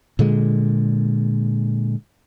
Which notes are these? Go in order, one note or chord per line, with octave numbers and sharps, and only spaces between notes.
A#2 D3 G#3